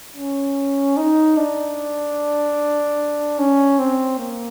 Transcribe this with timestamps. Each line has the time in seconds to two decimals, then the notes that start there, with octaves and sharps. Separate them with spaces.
0.16 C#4
0.97 D#4
1.37 D4
3.39 C#4
3.79 C4
4.19 A#3